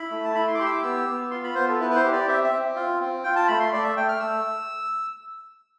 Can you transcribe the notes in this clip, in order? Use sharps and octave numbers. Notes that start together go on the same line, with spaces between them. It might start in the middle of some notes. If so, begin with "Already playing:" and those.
Already playing: E4 B5
A3
A5
E4 B5
C6
D6
G4 C6
E6
D6
B3 E6
B3
F4 C6
B5
B3 C5
A4
E4 B4
B4
C5
G4
D5
C4 E5
E5
C4
F4
C4
F4 G5
A5
A3 B5
C6
A3 D5
E5
A3 G5
F6
A3 E6